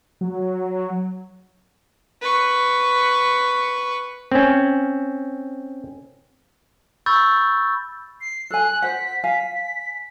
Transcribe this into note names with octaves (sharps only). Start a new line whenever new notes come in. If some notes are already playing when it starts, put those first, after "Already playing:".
F#3
B4 C#6
C4 C#4
B5 C#6 E6 G6 A6
C7
A4 G#5 F#6
C5 F#5 B6
F5 G#5 B6